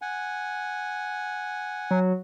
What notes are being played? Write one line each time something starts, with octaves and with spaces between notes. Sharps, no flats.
F#5 G#5
F#3